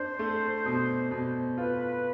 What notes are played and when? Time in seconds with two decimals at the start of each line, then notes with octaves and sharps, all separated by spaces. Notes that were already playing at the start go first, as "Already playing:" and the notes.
Already playing: D4 C5
0.19 A3
0.65 B2
1.11 B2
1.58 F4 B4